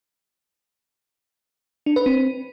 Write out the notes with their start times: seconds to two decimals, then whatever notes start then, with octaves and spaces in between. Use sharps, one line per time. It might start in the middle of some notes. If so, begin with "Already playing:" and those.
1.86 D4
1.96 B4
2.06 C4